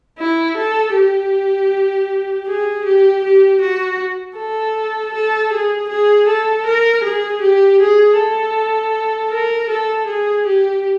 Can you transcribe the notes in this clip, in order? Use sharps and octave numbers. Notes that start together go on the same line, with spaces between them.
E4
A4
G4
G#4
G4
G4
F#4
A4
A4
G#4
G#4
A4
A#4
G#4
G4
G#4
A4
A#4
A4
G#4
G4